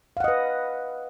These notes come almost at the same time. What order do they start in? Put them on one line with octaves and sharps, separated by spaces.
F5 F#5 D#5 B4